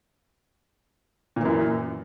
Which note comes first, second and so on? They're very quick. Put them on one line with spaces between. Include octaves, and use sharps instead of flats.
A#2 E3 F#2